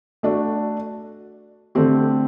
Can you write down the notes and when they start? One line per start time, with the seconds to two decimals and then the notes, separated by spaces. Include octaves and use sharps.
0.23 A3 D4 F#4
1.75 D3 A3 C4 G4